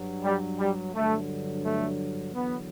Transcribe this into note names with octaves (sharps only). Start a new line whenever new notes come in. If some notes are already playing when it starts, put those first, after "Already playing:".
Already playing: G2 F#3
G3
G3
G2 D3 F#3 A3
A3
E2 D3 F#3 B3